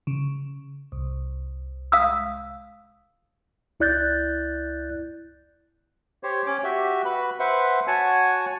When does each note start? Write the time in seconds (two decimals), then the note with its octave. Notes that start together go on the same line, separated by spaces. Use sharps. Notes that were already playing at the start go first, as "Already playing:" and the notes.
0.07 C#3
0.92 C2
1.92 F5 D#6 E6
3.80 C#2 E4 D5 F#6 G6 A6
6.23 G4 C5 C#5
6.46 C#4 C#5 D6
6.64 F#4 G4 E5
7.05 F#4 B4 B5
7.40 B4 C5 E5 F#5
7.87 F#4 C#5 F#5 G#5 A5